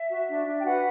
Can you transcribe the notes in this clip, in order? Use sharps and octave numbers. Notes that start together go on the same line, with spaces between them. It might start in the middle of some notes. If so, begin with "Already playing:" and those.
Already playing: E5
F#4
D4
D4
G5
F#4 B4 F#5